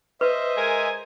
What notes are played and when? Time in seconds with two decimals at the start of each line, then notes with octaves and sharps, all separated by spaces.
0.21 B4 C5 D#5 E5
0.57 G#3 A#4 G#5